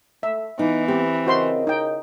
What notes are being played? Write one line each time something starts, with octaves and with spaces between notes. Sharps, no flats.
A3 E5
E3 B3 D#4
C4 G4
C#3 F#4 A#4 C5 D#5 C6
D#4 G5